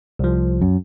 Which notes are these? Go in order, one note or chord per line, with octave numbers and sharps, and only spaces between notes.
C2 F3
F#2